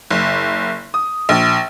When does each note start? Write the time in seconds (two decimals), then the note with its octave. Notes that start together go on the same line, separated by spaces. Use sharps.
0.10 F#1
0.94 D#6
1.29 A#1